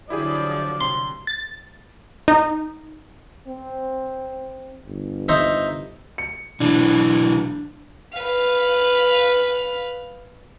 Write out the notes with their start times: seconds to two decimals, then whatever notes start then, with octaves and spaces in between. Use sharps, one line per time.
0.10 D3 F3 F#3 E4 G4 G#4 D5
0.81 C3 C6
1.27 A6
2.28 D#4
3.48 C4
4.86 G1
5.28 D#4 C5 E5
6.18 C#7
6.60 B1 E3 D4
8.18 B4 F5